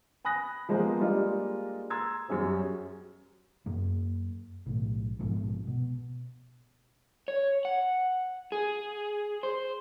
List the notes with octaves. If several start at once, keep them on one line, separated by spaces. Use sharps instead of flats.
G#5 B5 D#6 F#6 A#6
F3 G#3 A#3 B3 C5
G3 G#3 A#3 D4 F4 D#5
A#5 C6 E6 G#6 A6
F#2 G3 C#4 G#4 C5
F#2 A#3
B1 A2
A#1 G#2 B2 F3
B2
C#5
F#5
G#4
C5